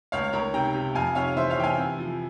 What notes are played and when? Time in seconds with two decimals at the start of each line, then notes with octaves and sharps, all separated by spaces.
0.12 C#2 C#5 F5
0.33 C#2 A#4 C#5
0.54 C3 G5 A#5
0.74 C3
0.95 F2 F5 G#5
1.15 C3 C#5 F5
1.36 E3 C5 E5
1.50 C#5 F5
1.58 E3 G5
1.64 F5 G#5
1.78 C3
1.98 F3